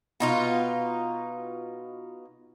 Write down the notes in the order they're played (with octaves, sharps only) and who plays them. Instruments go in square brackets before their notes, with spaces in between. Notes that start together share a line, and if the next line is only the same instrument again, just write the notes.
[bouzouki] B2 D#4 F4